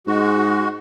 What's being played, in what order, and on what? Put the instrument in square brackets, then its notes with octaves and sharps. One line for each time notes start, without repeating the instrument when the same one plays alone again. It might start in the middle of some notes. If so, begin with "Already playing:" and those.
[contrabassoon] G#2 [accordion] G#3 F#4